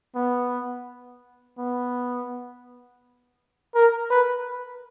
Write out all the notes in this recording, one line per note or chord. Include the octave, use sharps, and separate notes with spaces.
B3
B3
A#4
B4